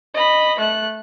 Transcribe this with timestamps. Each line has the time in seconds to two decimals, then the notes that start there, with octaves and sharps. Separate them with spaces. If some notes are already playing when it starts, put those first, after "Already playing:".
0.15 D#5 B5
0.59 A3 F#6